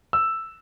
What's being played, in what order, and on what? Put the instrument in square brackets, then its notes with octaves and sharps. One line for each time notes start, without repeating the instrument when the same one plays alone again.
[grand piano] E6